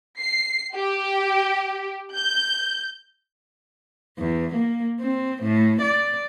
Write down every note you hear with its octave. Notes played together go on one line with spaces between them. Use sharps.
C7
G4
G6
E2
A#3
C4
A2
D5